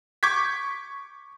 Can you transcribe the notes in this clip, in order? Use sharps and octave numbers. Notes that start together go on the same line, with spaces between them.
C#6 D6 G6 G#6 B6